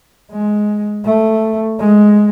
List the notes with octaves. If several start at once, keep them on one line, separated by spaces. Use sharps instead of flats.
G#3
A3
G#3